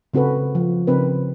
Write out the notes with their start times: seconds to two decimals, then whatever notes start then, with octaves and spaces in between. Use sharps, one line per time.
0.14 C#3 C4 F#4 A4 B4
0.55 F3
0.87 C#3 C4 A#4 B4